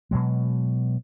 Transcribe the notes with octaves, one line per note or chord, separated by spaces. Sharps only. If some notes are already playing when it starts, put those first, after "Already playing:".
B2 F#3 G#3